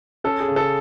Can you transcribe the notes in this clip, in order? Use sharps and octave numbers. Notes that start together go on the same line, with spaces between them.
C#4 A4
G#4
C#3
A4